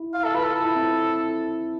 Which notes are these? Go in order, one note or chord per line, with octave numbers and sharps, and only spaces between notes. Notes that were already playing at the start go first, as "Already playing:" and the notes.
Already playing: E4
F5
A4
F4 B4
A4
A4
E4
C4